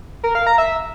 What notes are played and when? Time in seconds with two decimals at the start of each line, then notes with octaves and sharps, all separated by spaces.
0.23 A#4
0.35 F5
0.47 A#5
0.58 E5